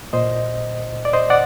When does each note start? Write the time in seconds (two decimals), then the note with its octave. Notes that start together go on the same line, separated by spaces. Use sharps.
0.13 A#2 C5 D#5
1.05 D5
1.13 C5 D#5
1.30 D5 F#5